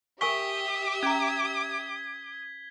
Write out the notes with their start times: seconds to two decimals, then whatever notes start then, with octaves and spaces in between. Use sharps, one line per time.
0.21 G4 A#4 E5 G#5 C#6 D#6 B6 G7
1.03 C#4 A#5 G#6